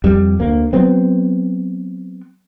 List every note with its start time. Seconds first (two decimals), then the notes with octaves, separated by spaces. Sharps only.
0.04 F2 G3
0.40 D2 A#3
0.73 F#3 B3 C4